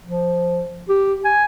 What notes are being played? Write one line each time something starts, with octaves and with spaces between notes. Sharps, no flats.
F3
G4
G#5